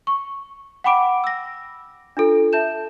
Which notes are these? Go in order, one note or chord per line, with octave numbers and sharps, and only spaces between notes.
C#6
F#5 G5 B5 D6 D7
E6 A#6
D4 F4 A4
E5 A5 G6 E7